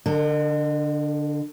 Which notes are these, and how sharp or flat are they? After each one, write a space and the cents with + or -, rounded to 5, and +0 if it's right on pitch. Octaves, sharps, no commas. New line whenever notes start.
D3 +0 A#4 -40 D#5 -40